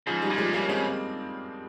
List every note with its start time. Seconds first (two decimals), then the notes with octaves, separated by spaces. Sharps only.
0.07 G#2 C#3 F3
0.22 D#3 G3
0.30 A#2
0.37 F3 G#3
0.53 C#3 G3 A#3
0.69 C#3 G#3 C4